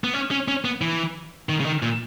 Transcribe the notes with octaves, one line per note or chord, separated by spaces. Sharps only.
B3
C#4
C#4
C#4
B3
E3
D#3
C#3
D#3
A#2